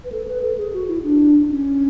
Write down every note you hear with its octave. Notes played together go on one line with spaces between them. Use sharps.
B4
A4
B4
A4
G#4
F#4
E4
D4
C#4